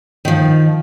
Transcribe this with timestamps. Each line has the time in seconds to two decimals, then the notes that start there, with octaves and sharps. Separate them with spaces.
0.25 D#3 F3